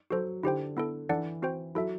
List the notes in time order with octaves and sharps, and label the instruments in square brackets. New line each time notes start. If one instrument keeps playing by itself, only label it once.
[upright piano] F#3 [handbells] F#4 A4 C5
[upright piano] D3 [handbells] E4 G4 C5 G5
[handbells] B3 E4 A4
[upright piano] E3 [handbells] D4 A4 D5 F#5
[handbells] C4 F#4 C5 G5
[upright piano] F#3 [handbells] E4 A4 E5